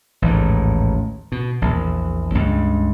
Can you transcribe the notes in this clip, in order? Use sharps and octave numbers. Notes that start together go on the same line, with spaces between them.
A1 D#2 G#2
B2
A#1 E2
C#2 G2